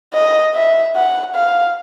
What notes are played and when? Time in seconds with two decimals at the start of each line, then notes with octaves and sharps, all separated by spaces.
0.14 D#5
0.55 E5
0.96 F#5
1.36 F5